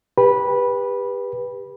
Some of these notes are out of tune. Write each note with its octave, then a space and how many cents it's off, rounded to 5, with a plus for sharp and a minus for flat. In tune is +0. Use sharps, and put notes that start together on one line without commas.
G4 +25 B4 -10 B5 -15